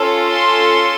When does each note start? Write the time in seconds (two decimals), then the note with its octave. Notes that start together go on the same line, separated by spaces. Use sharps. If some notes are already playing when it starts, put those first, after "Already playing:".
Already playing: C#4 F4 A4
0.29 C6